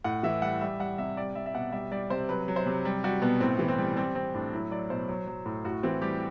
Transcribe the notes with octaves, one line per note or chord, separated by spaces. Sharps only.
A2 F#5
E3 E5
G3 F#5
G3 E5
G3 F#5
C3 E5
G3 D5
G3 E5
E5
B2 F#5
G3 E5
G3 D5
C3 C5
F#3 B4
F#3
C5
C3
G3
G3 F#4
B2 B3
A2 C4
E3
C4
G3
G3 C4
G3 C4
A2 D4
F#3 E4
F#3 D5
B2 C5
F#3
F#3
A2
A2 F#4
E3 C4
G3 G4